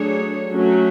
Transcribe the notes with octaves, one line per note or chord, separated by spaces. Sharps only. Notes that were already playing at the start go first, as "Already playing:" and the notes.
Already playing: F#3 A3 D4 G#4 C#5
F#3 A3 C#4 F#4